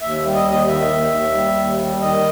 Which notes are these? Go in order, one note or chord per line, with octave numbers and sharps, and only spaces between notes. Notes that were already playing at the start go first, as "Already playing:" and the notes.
D#2 E5
G3
D#5
D#2 D#5
D#3 E5
D#2
D#2
G3
D#2
G3
D#3 D#5